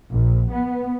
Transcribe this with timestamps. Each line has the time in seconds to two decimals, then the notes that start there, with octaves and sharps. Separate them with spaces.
0.10 A#1
0.52 B3